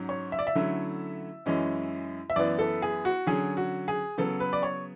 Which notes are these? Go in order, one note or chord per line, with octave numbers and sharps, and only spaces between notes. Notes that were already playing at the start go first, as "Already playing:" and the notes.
Already playing: G#2 F#3 C#4
C#5
E5
D5
E5
D3 F#3 A3 C#4 E4
F#2 E3 G#3 C#4 E4
E5
F#2 E3 B3 E4 D5
A4
G#4
F#4
D3 F#3 C#4 G#4
F#4
G#4
C#3 F#3 B3 A4
B4
D5
C#5